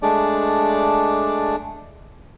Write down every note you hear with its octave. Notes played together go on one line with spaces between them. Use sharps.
G#3 A3 D4 D5